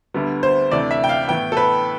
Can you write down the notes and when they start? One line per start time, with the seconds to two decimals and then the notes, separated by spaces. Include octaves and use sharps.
0.14 D2 D3 G3 B3
0.43 C5
0.71 D2 C3 E3 A3 D5
0.91 E5
1.04 G5
1.09 F5
1.28 A2 E3 B3 G5
1.52 A4
1.57 B4